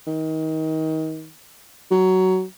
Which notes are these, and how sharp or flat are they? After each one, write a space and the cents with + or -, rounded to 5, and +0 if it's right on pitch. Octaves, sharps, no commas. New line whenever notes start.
D#3 +25
F#3 +15